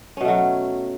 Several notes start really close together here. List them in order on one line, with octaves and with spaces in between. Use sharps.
C#4 B2 A3 F#3